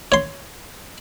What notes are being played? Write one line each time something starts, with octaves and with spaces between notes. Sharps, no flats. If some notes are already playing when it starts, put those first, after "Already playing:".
C#5 C6